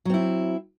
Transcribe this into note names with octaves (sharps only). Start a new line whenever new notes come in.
F#3 C4 E4